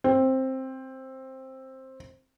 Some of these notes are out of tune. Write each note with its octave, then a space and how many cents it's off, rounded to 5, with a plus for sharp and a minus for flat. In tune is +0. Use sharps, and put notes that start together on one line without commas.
C4 +10